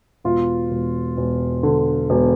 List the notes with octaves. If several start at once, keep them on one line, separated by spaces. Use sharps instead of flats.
E1 F4
E1
E1
D3
E1